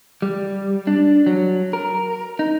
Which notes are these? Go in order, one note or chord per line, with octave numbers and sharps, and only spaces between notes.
G3
D4
F#3
A#4
D#4